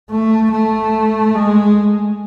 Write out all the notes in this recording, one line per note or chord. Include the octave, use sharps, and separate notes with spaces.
A3
A3
G#3